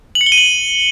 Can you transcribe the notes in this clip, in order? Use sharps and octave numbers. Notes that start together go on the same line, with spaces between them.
F#7
C#7
G7
D#7
F#7